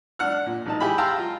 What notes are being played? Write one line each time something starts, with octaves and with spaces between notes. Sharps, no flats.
D4 F#5 F6
A#2
A1 D#4 A5
E4 G4 G#4 B5
F5 G5 A5 A#5 C6 E6
F4